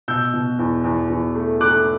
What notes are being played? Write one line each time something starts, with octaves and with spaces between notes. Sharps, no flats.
B2 E6 G6
B2
E2
E2
E2
A3
A3 D6 F#6